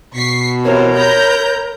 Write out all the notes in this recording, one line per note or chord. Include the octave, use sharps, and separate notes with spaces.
B2 C#6 B6 C7
C3 E3 A#4 C5 C#5
A#5 B5 G6